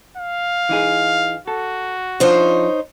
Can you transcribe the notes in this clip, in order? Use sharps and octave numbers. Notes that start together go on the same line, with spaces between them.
F5
E3 D#4 G#4
F#4 A4
F3 D4 D#4 F4 C5 C#5